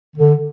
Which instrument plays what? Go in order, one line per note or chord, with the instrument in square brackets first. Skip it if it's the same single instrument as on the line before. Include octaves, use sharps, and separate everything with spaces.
[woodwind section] D3